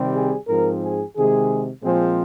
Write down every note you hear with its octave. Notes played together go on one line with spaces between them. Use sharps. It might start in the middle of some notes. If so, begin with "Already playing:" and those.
Already playing: C3 D#3 G3 C4
G#4
G#2 F3 C4 A#4
G#4
C3 D#3 G#3 G#4
A#2 F3 G#3 C4 G#4